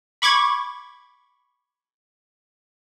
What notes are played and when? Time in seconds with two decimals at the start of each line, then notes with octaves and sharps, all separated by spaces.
0.22 B5 C#6 D6 G#6